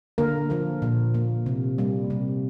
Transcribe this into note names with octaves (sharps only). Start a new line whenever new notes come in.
D3 A#3 A#4
F3 A#3
A#2
A#3
C3
G3 A#3
C3